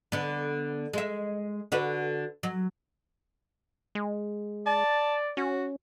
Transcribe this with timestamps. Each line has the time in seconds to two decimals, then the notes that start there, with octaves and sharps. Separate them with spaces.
0.12 D3 B3
0.93 G#3 E5
1.72 D3 F#4 B4
2.43 F#3
3.95 G#3
4.66 D5 A5
5.37 C#4 F#4